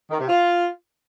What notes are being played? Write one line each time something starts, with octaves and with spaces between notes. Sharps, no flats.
D#3
C3
F4